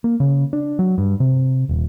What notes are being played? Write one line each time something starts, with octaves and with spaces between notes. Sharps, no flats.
A#3
C#3
D4
F#3
G2
C3
D#1